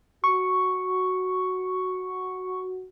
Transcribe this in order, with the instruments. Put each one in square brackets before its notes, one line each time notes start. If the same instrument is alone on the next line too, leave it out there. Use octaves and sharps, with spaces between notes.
[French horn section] F#4 [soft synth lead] C#6